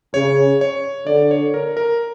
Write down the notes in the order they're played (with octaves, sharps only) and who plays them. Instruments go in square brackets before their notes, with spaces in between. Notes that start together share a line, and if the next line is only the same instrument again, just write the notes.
[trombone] C#3 [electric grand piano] C#5
[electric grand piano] C#5
[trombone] D3 [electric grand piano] D5
[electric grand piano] C#5
A#4
A#4